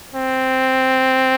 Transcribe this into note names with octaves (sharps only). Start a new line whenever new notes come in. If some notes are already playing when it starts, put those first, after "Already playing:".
C4